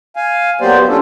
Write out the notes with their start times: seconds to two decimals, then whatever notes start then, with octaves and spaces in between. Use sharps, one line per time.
0.16 F5 G#5
0.61 F#3 A#3 B3 G4 C5 D5
0.88 C#4 D4 F4 A4